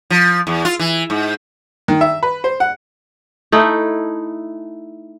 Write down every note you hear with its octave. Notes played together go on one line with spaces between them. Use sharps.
F3
E2
F4
E3
G#2
D#3
E5
B4
C5
F#5
A3 D#4 E4